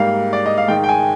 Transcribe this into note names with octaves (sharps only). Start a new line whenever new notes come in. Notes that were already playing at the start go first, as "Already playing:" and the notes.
Already playing: G#2 G3 A#3 F5
D5
D#5
F5
G#2 D#3 G#3 D#4 G5
G5
G#5